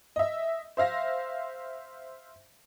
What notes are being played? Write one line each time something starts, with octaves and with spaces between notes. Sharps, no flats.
D#5 E5
C5 E5 F5 A#6